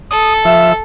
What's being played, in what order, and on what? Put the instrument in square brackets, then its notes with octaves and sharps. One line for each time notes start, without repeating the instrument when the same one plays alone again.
[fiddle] A4 [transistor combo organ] D#6
[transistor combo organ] F3 E6 [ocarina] E5